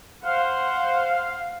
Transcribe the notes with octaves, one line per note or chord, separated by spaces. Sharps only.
C5 F5 F#5